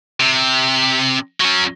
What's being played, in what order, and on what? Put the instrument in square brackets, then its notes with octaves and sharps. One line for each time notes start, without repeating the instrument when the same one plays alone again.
[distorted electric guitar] C3
F#3 C#4